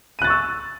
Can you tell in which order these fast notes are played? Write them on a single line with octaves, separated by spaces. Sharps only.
D#7 F#6 A6 C#6 E6